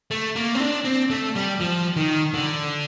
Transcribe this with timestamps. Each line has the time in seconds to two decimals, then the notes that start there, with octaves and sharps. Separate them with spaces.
0.11 A3
0.36 A#3
0.55 C4
0.60 D4
0.85 C4
1.10 A3
1.35 G3
1.60 F3
1.96 D#3
2.34 D3